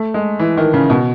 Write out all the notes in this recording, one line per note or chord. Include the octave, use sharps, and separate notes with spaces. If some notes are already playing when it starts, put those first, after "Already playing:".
Already playing: A3
G#3
E3
D#3
C#3
B2